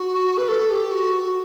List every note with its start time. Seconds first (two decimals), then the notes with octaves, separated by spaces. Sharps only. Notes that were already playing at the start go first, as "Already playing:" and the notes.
Already playing: F#4
0.37 B4
0.48 A4
0.70 G4
0.91 F#4
1.23 F#4